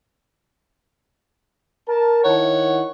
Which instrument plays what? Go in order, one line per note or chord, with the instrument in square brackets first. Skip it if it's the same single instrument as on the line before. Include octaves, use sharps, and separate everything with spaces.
[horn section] A#4 A5
[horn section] D#3 E4 F#5 [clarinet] C#5